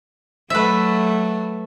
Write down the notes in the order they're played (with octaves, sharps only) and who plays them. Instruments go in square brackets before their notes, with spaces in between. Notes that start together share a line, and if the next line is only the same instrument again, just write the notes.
[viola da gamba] F#3 A3 [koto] B4 E5